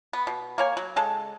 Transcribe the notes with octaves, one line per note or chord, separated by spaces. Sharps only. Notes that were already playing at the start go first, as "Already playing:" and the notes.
B3
B2
A#3 C#5 G#5
F#3
C#3 G#3 A4